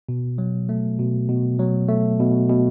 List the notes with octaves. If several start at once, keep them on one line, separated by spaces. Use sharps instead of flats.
B2
F#3
A3
B2
B2
F#3
A3
B2
B2